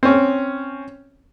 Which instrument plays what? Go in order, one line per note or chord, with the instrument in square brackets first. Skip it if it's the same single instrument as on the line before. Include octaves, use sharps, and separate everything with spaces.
[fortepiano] C4 C#4